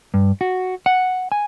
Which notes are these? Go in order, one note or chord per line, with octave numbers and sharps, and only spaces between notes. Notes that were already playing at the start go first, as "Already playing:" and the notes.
G2
F#4
F#5
G#5